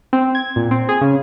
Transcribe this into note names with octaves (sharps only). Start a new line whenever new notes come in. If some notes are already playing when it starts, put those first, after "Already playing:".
C4
G#6
A#2
C4
G#4
C#3